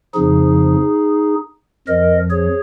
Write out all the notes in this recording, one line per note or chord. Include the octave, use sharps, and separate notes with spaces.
F2 C#3 F3 D#4 G#4
F2 F3 A#4 D#5
G#4 C#5